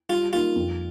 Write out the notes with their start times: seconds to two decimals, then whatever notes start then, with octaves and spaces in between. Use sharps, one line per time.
0.09 G3 F4
0.33 A#3 D#4 F4
0.55 F2